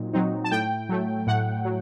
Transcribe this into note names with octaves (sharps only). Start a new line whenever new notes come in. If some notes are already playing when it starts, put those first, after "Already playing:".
Already playing: A#2 F#3 C4 D#4
F#3 C4 D#4
A5
A2 G5
F#3 A3
A2 F#5
F#3